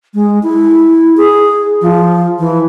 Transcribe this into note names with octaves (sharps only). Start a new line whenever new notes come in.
G#3
E4
G#4
F3
E3